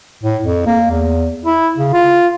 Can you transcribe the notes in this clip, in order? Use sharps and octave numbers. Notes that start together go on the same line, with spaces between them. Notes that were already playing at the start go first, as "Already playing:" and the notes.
A2
F2
A#3
E2
E4
C#3
F4